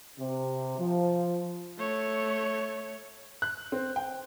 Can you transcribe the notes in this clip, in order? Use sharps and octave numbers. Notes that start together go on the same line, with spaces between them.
C3
F3
A3 C#5
F#6
C4
G5